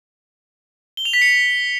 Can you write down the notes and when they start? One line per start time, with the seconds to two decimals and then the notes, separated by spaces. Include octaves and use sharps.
0.97 G7
1.05 F7
1.13 B6
1.22 C#7